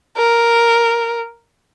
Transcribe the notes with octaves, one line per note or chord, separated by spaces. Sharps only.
A#4